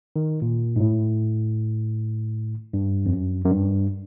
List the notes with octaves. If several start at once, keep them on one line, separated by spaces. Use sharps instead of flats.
D#3
A#2
G#2
A2
G2
F2
F#2
F#2
G2